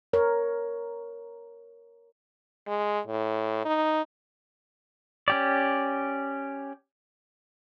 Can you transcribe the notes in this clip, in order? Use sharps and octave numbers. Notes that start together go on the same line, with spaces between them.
A#4 C#5
G#3
A2
D#4
C#4 G4 D5